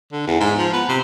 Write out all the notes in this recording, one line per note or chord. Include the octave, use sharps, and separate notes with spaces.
D3
E2
G#2
F3
B3
C3